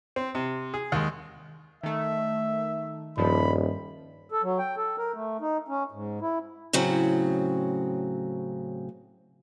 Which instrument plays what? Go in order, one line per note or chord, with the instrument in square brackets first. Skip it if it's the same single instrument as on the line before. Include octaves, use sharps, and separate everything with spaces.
[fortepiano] C4
C3
G#4
D#2 G#3
[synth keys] D#3 A3 [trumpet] E5
[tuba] D#1 [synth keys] G2 F3 [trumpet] B5
[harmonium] A4
F#3
G5
A4
A#4
A3
D#4
C#4
G#2
E4
[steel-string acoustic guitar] A2 C#3 F#3 C4